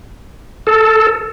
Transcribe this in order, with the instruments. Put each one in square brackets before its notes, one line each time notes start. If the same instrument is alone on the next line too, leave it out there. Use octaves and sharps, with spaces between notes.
[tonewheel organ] A4